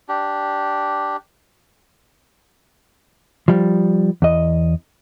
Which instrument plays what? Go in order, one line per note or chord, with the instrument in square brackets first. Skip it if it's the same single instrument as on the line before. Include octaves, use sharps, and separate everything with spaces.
[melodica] D4 G4
[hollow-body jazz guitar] F3 G3
E2 D#5